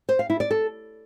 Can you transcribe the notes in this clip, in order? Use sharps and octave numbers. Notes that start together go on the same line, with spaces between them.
C5
F5
E4
D5
A4